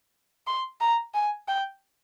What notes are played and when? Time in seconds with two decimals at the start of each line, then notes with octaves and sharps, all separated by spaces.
0.47 C6
0.81 A#5
1.14 G#5
1.48 G5